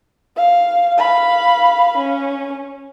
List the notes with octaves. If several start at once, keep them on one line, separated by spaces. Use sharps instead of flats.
F5
F5 B5
C#4